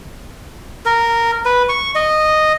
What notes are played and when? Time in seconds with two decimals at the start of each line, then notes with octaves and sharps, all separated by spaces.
0.86 A#4
1.45 B4
1.69 C#6
1.95 D#5